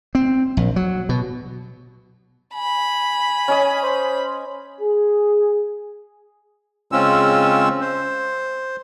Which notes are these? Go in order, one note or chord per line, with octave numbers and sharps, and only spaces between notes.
C4
A#1
F#3
B2
G#5 B5
C#4 D#5 D#6
C5
G#4
C#3 G#3 C4 C#4 F4 E6
C5